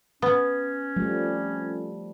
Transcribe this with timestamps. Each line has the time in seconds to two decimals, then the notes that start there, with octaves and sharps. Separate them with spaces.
0.22 B3 C#4
0.96 F3 G3 A3